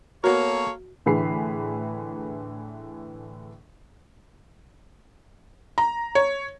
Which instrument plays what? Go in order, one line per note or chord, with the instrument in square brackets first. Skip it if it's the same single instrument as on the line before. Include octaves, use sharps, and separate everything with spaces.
[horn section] A#3 A4 C#5 [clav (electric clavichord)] B3 A#4 [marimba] F#4
[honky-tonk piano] A2 D3 E3 G#4 B5 C7
[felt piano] A#5
C#5